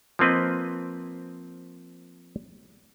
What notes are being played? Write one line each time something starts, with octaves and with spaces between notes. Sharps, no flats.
F3 A#3 C4 B4 D#5